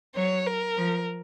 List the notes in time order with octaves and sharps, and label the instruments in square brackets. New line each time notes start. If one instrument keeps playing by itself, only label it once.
[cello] F#3 [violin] C#5
[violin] A#4
[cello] F3